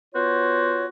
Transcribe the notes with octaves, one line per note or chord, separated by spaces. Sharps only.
B3 F4 F#4 C5 C#5